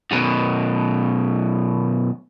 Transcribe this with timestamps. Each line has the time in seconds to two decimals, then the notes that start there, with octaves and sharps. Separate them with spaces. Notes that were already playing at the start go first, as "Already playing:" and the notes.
0.11 F#2 B2